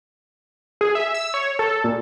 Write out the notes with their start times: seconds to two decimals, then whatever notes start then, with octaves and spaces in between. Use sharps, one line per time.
0.81 G#4
0.95 E5
1.14 E6
1.34 C#5
1.59 A4
1.84 A#2